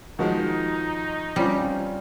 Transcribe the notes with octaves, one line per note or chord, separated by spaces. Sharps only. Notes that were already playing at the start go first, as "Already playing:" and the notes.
D#3 F3 G#3 D#4 F#4
G3 C4 C#4 F4